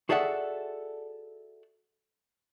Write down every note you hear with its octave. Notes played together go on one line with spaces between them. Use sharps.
F#4 G#4 A4 D5 E5 F#5